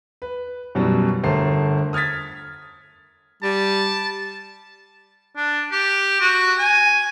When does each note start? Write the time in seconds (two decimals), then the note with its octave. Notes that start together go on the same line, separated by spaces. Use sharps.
0.22 B4
0.75 F#2 B2 E3 F#3 G3
1.23 G1 A3 A#4 C5 A5 C7
1.93 D#6 F6 G#6 A6 B6
3.43 G3 A5
5.36 D4
5.71 G4
6.20 F#4
6.58 G#5